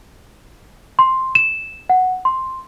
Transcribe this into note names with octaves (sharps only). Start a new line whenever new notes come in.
C6
E7
F#5
C6